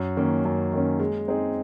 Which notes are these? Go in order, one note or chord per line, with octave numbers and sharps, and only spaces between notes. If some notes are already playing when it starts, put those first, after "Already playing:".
Already playing: F#2
D#3 A#3 C#4
F#2
D#3 A#3 C#4
G#3
C4 D#4 G#4